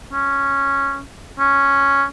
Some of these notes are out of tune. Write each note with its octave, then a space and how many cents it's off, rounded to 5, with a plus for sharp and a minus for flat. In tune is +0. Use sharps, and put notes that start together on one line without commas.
C#4 -5
C#4 +0